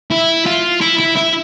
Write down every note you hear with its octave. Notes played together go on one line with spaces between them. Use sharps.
E4
F4
E4
E4
E4